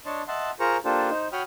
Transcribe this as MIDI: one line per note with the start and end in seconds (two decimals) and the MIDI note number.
0.06 0.22 62
0.06 0.22 73
0.06 0.22 75
0.06 0.22 81
0.06 0.22 84
0.28 0.50 75
0.28 0.50 76
0.28 0.50 78
0.28 0.50 81
0.28 0.50 84
0.60 0.77 65
0.60 0.77 68
0.60 0.77 70
0.60 0.77 72
0.60 0.77 82
0.60 0.77 85
0.85 1.10 58
0.85 1.10 62
0.85 1.10 65
0.85 1.10 67
0.85 1.10 69
0.85 1.10 72
1.10 1.28 63
1.10 1.28 72
1.32 1.42 66
1.32 1.42 73
1.32 1.42 79
1.32 1.42 83
1.32 1.42 87
1.32 1.42 89